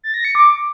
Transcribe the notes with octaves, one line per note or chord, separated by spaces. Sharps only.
A6
A#6
C#7
D6